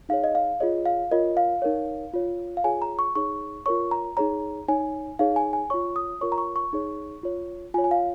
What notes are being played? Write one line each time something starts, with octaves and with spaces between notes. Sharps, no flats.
D#4 G#4 C#5 F5
D#5
F5
F4 G#4 C#5 D#5
F5
F4 A#4 C#5 D#5
F5
D#4 A#4 C#5
F4 C#5
F5
F4 G#4 C#5 G#5
A#5
C#6
D#4 G#4 C#5 C#6
F4 A#4 C#5 C#6
A#5
D#4 G#4 C#5 A#5
D#4 C#5 G#5
D#4 G#4 C#5 F5
G#5
G#5
F4 C#5 C#6
D#6
F4 A#4 C#5 C#6
A#5
C#6
C#6
D#4 G#4 C#5
F4 C#5
F4 C#5 G#5
G#5
F5